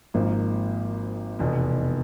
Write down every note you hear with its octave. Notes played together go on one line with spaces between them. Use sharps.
G#1 G#2 F3 A#3 D#4
F1 E2 B2